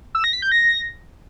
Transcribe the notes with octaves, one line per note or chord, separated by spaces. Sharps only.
E6
A#6
B6
G6
A#6